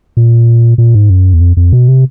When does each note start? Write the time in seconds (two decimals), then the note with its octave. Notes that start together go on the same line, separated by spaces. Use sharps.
0.17 A#2
0.78 A#2
0.94 G#2
1.10 F#2
1.34 E2
1.41 F2
1.57 F2
1.73 B2
1.88 C3